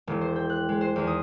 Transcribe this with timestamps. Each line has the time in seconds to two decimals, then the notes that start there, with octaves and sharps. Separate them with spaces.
0.07 E1
0.21 C5
0.36 G5
0.50 F#6
0.69 G#3
0.81 C5
0.96 E2
1.07 D#6